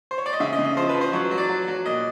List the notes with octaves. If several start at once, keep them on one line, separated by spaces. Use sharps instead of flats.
C5
C#5
D5
D#5
C#3 E5
D#5
C#3
D#5
F3 C5
B4
F3
C5
F#3 C#5
F#3
D5
F#3
F#3
A#2 D#5